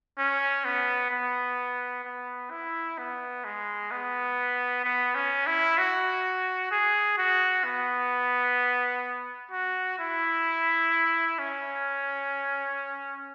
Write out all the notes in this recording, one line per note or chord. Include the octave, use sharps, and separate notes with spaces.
C#4
B3
B3
B3
E4
B3
G#3
B3
B3
C#4
E4
F#4
G#4
F#4
B3
F#4
E4
C#4